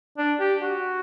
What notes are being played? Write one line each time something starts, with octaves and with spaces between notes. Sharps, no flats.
D4
G4
F#4